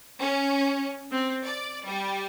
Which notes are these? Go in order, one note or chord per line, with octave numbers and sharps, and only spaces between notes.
C#4
C4
D5
G3